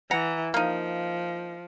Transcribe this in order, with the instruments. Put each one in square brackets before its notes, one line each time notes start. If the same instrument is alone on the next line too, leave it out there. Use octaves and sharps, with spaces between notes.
[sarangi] E3 [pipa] F#5 A#5
[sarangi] F3 [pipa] A#3 D#4